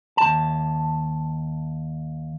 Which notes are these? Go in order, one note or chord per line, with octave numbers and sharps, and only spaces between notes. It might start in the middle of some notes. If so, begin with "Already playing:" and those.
D#2 A5